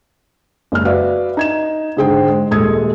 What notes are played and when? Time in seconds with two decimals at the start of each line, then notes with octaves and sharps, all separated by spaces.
0.72 F#1 G#3 F6
0.85 F#4 B4 D5 E5 F5
1.37 D#4 G#6 E7
1.97 G#2 D3 G#4 C5 G5
2.30 G#3
2.51 D#1 G#3 A4 D#6 G#6